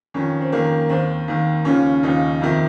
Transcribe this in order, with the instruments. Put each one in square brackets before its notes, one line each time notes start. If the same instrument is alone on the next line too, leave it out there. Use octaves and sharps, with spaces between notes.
[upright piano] F2 D#3 C#4
C4
F2 D#3 A#3
D#2 D#3 C4
D#2 D#3
D#2 C#3 F3 C#4
D#2 C#3 F3 D#4
F2 C3 D#3